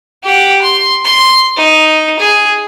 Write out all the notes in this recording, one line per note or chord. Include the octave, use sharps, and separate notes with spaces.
G4 F#5
C6
C6
D#4
G#4